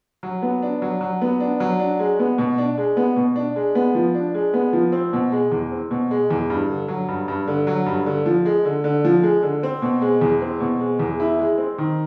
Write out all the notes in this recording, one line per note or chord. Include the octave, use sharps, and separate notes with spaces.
F#3
B3
D4
F#3
F#3
B3
D4
F#3
D4
G#3
B3
B2
D4
G#3
B3
B2
D4
G#3
B3
F3
D4
G#3
B3
F3
C4
B2
G#3
E2
C4
B2
G#3
E2
G2
D3
F#3
G2
G2
D3
F#3
G2
D3
F3
G#3
D3
D3
F3
G#3
D3
C4
B2
G#3
E2
C4
B2
G#3
E2
E4
G#3
C4
D#3